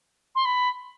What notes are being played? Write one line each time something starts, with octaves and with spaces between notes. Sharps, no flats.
C6
B5